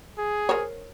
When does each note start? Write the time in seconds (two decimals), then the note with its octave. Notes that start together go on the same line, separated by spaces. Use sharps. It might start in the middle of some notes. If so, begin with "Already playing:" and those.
0.18 G#4
0.49 A#4 C5 C#5